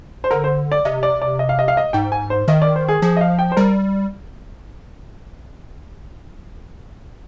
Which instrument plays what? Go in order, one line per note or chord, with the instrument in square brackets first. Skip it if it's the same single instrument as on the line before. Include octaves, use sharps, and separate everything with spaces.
[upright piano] C5
[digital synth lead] D3 [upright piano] A#4
[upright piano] C5
D5
[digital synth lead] C3 [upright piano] D#5
[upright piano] D5
D5
D#5
F5
D#5
F5
D#5
[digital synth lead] G#2 [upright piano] G5
[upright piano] G#5
C5
[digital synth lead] D#3 [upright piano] D#5
[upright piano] D5
C5
G#4
[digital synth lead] F3 [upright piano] G#4
[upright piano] D#5
F5
G5
C5
[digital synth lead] G3 [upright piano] A#4